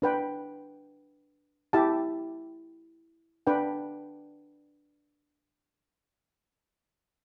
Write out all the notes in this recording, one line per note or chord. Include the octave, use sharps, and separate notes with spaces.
D4 B4 G5
E4 G4 E5 A5
D4 B4 G5